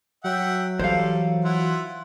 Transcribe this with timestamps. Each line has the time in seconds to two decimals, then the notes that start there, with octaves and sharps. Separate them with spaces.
0.24 F#3 E5 F#5 G5
0.79 E3 G3 A4 C5 F5
1.44 E4 F4 F#5